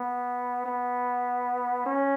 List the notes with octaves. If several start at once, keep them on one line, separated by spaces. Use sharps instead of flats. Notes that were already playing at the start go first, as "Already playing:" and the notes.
Already playing: B3
B3
C#4